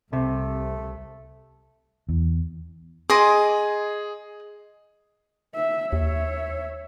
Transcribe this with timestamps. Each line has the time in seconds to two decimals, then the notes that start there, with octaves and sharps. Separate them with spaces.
0.13 C2 C3 A3
2.09 E2
3.10 G#4 D#5 C6 D6
5.55 E5
5.93 D#2 C#5 E5